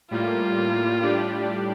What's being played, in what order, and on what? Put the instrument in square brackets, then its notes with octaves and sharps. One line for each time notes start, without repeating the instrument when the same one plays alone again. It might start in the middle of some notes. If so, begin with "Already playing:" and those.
[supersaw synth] A2 G3 A#3 [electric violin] F4
[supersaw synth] A2 G3 D4 G4 D5